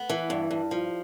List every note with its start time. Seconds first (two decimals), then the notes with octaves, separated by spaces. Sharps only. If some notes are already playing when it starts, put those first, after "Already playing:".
Already playing: B3
0.10 E3
0.30 G2
0.51 G2
0.71 F3